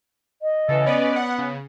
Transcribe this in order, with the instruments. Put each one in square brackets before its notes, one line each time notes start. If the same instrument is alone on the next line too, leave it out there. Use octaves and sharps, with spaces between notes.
[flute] D#5
[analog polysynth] C#3 [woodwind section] E3 A4
[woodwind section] B3 [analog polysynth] C#4 B4 D5
[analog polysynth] F#5
C#3